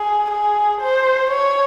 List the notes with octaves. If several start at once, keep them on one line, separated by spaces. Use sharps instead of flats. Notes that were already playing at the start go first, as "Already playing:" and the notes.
Already playing: G#4
G#4
C5
C#5